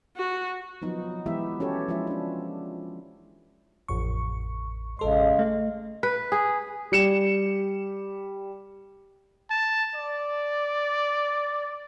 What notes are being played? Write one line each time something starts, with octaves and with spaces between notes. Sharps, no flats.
F#4
F3 F#3 B3 D#4
E3 G#3 B3 E4 G4 E5
C#4 F#4 G4 A4 C#5
F3 G#3 E4 F4 E5
C#4 D4
A1 F2 C#6
A1 C#3 G#3 A4 C6
A3
B4
G#4
G3 C#7 E7
A5
D5